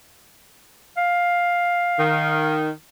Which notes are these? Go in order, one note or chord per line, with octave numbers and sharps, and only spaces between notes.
F5
D#3